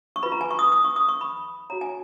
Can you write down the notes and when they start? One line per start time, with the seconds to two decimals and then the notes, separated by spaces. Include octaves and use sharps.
0.16 C#6
0.23 F4 B4 B5
0.32 A#5
0.41 G#5
0.51 C#6
0.59 D#6
0.72 D#6
0.84 C#6
0.96 D#6
1.09 C#6
1.21 B5
1.70 F#4 C#5 A#5
1.81 G#5